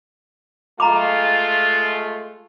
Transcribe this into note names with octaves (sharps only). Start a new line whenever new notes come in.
G#3 A3 F4 A#5 B5 D6